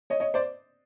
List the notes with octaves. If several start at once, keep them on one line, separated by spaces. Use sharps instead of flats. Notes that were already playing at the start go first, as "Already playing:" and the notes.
C#5 D#5
C#5 D#5
C5 D5